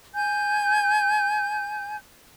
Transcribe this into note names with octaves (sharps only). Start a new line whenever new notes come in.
G#5 G6